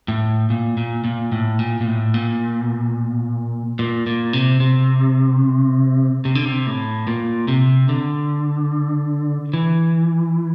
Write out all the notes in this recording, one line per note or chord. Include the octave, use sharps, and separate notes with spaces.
A2
A#2
A#2
A#2
A2
A#2
A#2
A2
A#2
A#2
A#2
C3
C3
C3
D3
C3
A2
A#2
C3
D3
E3